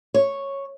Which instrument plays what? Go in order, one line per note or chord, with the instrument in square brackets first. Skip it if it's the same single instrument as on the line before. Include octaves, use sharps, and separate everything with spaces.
[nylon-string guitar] C#5